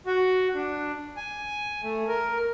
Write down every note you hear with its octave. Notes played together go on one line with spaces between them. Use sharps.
F#4
D4
G#5
A3
A#4